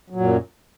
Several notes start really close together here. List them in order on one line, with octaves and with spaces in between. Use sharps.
F#3 A#2 F#2